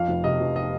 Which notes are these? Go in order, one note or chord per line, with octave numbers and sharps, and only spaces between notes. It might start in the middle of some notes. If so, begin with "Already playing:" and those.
Already playing: F2 F5
F1
C3 D#5
F1
D#5